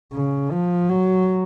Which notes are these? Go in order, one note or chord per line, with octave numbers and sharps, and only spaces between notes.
C#3
F3
F#3